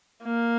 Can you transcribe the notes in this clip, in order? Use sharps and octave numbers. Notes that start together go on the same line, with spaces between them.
A#3